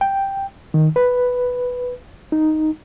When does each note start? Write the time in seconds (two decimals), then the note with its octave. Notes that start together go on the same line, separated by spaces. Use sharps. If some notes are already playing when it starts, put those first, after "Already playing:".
0.01 G5
0.74 D#3
0.96 B4
2.32 D#4